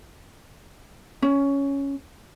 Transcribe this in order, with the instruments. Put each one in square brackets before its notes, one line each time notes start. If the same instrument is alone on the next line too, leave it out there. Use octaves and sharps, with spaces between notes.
[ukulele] C#4